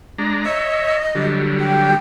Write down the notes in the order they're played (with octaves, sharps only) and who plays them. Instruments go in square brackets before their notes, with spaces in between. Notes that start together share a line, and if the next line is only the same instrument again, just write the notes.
[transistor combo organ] G#3 D4 A#5
[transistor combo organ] C#5 E5 [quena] D#5
[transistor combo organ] D3 F#3 G3
[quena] G5